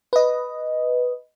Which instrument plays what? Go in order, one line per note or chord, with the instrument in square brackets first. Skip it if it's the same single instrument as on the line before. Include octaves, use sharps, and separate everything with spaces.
[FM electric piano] B4 D#5